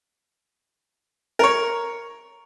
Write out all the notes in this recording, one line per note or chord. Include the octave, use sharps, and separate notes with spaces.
A#4 C#5